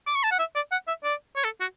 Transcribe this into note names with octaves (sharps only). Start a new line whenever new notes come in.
D6
C#6
A5
F#5
E5
D5
F#5
E5
D5
C#5
A4
F#4